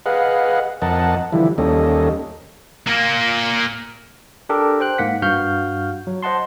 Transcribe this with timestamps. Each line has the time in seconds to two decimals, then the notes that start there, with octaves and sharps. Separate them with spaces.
0.06 G#4 B4 D#5 F5 F#5
0.82 F2 A#4 D#5 F#5 A5
1.32 D3 E3 F3 G3 E4
1.58 D#2 G3 A#3 C#4 A4 D#5
2.88 A#2 A#3
4.49 D4 G4 A4 A#4
4.80 C5 G5 F#6
4.98 G#2 A#3 F#5 B6
5.22 G2 F#4 F5 F#5 F6 G6
6.07 F#3
6.23 C5 D#5 F#5 A5 C6